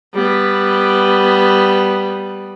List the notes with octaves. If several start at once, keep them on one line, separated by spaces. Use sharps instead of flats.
G3 B3